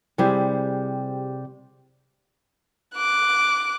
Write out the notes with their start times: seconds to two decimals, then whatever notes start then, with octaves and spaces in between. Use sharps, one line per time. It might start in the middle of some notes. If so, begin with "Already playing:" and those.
0.18 C3 G3 E4 G#4 C5
2.95 D6 F#6